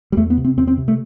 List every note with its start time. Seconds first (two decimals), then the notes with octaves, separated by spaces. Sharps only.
0.12 G3
0.17 E2 A3
0.30 B3
0.37 C3
0.44 C4
0.57 E2 C4
0.67 C4
0.78 C3
0.88 A3